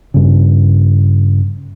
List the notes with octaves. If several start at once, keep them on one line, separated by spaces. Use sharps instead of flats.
G2 C#3